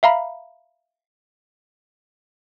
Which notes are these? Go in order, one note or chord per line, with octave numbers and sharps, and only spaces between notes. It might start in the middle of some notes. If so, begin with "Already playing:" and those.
E5 F5 A#5 B5